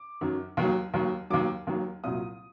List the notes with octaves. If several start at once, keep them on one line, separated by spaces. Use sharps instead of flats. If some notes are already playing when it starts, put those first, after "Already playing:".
Already playing: D6
F#2 D#3 F#3
D#2 D#3 F#3
D#2 D#3 F#3
D#2 D#3 F#3 D6
D#2 D#3 F#3
C2 A#2 F#3 D#6